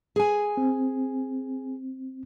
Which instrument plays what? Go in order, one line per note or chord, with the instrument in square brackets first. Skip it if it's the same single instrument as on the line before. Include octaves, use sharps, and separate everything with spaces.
[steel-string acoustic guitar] G#4 G#5
[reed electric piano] C4